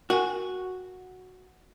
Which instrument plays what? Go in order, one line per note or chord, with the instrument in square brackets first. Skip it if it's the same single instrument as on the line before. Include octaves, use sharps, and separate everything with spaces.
[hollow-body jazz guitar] F#4 [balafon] A#4 G5 G#5